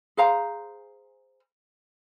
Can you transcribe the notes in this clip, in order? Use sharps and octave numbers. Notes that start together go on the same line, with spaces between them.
G#4 C5 F5 A#5